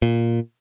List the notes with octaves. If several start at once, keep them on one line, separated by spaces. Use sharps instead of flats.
A#2